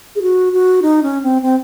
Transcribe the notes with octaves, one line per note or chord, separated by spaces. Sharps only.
G#4
F#4
F#4
D#4
C#4
C4
C4